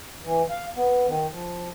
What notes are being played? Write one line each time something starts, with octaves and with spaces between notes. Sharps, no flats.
E3
F5
B3
D#3
F3